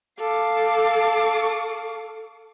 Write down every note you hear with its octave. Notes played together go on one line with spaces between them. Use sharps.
A4 F5 D6